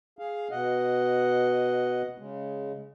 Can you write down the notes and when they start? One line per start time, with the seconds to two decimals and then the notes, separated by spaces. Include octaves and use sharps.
0.19 G#4 F5
0.51 B2 D#5 F#5
2.18 C#3 G#3